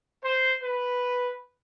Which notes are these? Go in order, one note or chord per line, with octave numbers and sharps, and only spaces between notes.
C5
B4